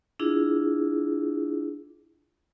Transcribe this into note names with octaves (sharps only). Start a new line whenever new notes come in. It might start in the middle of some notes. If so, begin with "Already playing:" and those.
D4 E4 F4 G#4